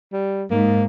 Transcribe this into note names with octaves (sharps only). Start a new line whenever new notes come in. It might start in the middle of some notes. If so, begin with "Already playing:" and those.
G3
G#2 A#3